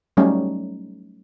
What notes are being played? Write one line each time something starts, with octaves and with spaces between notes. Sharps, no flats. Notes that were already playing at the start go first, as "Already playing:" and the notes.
F#3 G3 A3 C#4 D#4